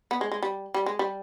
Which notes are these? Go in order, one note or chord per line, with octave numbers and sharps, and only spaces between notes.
B3
G#3
G#3
G3
G3
G#3
G3